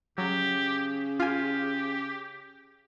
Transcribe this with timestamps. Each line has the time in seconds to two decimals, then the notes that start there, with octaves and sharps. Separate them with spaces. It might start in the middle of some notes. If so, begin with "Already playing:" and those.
0.18 C#3 F#3 G4
1.20 F4 G4 G#5